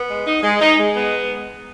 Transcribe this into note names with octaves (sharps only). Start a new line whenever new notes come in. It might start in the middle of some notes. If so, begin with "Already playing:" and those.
Already playing: B3
G#3
D#4
G#3
D#4
G#3
B3